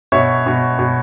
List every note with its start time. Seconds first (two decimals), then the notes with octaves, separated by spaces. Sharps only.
0.12 B2 C#5 E5
0.46 B2
0.79 B2